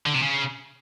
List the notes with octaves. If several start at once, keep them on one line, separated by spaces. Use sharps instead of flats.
D3
C3
C#3